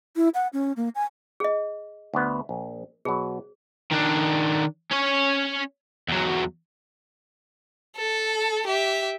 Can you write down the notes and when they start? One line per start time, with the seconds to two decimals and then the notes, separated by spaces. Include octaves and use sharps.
0.16 E4
0.35 F#5
0.53 C#4
0.77 A#3
0.95 G#5
1.40 G#4 D#5
2.14 D2 B3
2.49 A#1
3.05 B2 F#3 G#4
3.92 D#3 D4
4.91 C#4 C#5
6.08 E2 F#3
7.96 A4
8.67 G4 E5